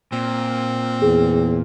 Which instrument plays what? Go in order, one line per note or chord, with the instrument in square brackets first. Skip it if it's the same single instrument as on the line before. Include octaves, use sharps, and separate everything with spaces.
[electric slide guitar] A#2 [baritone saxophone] C4
[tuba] E2 [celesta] G#4